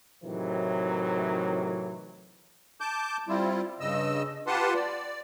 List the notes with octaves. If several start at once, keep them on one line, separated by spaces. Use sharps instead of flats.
A2 C3 D#3 E3 F#3
A5 D6 G6
G3 C4 E4 F4
G2 C#3 D#5 E6
F4 G4 B4 F#5 A5 C6
D5